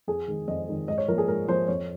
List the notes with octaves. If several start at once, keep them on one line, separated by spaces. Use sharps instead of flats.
F2 G#4
D#3 G#3
F2 D#5
D#3 G#3
G#2 D#5
C#5
F3 A#3 A#4
G#4
G#2 A#4
F3 A#3 C5
F2 C#5